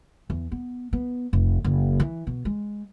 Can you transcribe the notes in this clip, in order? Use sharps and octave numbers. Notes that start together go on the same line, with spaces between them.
E2
B3
B3
F1
F#1
E3
B2
G#3